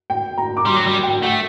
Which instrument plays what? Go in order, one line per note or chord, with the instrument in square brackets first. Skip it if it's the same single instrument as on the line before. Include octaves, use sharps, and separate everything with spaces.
[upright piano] G5
A#5
D6
[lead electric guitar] G3 [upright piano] C6
[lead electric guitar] F#3
G3
[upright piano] G5
[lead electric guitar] A3 [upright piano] F#5